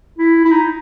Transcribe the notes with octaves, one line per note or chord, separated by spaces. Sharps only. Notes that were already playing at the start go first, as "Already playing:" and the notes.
E4
E4
D#4